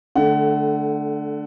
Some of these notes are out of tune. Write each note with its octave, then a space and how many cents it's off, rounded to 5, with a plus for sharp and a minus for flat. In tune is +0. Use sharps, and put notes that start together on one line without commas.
D3 +0 A3 -15 F#5 +30